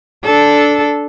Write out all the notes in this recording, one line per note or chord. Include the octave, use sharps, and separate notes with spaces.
D4 A4